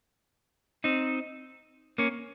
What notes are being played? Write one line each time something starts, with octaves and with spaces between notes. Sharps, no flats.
C4 D#4
A#3 C#4